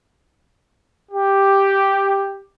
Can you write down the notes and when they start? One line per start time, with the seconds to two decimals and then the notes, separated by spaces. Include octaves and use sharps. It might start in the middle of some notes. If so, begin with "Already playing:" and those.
1.11 G4